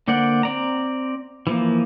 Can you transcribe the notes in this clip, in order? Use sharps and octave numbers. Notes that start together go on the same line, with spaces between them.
D3 A#3 C5 D5 F#5
C4 D5 A#5
E3 F3 A#3